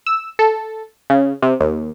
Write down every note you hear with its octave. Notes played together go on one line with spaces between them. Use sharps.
E6
A4
C#3
C3
D#2